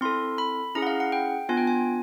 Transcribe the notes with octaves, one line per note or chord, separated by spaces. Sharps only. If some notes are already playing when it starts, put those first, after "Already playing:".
C4 E4 A4 C6
B5
C#4 E4 G#4 A#5
F#5
F5
F#5
G5
B3 D4 F4 G#5
G5
G#5